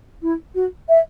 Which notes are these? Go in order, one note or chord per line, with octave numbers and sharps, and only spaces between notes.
E4
F#4
E5